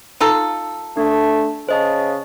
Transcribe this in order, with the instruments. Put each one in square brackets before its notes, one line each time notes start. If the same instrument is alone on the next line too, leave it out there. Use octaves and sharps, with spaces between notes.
[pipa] D#4 F4 A4
[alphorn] A3 [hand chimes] D4
[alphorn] C#3 [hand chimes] C5 D#5 A5